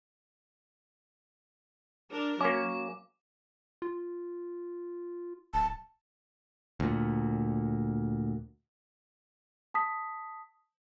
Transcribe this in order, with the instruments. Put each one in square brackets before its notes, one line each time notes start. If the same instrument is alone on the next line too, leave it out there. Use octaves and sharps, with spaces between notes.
[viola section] D4 A#4
[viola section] F#3 [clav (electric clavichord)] A#3 C#4 [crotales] D6
[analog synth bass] F4
[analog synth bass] D1 [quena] A5
[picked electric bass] D2 A#2
[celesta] A5 D#6 B6